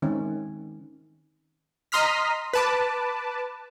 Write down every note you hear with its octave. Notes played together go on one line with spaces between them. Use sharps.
D#3 G#3 C4 C#4
D#5 A#5 C6 D#6 F6 B6
B4 A5 D6